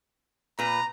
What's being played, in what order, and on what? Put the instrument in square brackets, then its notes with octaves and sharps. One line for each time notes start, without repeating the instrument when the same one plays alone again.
[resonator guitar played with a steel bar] A#2 B4 [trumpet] A#5